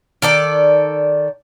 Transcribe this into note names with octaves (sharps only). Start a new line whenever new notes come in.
D#3 A4 D5